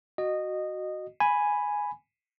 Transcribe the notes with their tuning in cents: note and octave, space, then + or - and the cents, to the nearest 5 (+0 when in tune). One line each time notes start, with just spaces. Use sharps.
F#4 +0 D#5 -15
G#5 +0 B5 +0